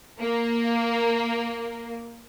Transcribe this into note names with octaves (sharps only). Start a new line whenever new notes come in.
A#3